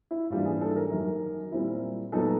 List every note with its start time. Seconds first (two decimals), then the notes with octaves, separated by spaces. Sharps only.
0.11 E4
0.30 G#2 E3 G3 A#3 D4 F4
0.45 G#4
0.61 A4
0.76 A#4
0.91 F#2 D#3 F#3
1.52 A#2 G3 C4 E4
2.12 A#2 F#3 B3 D#4 A4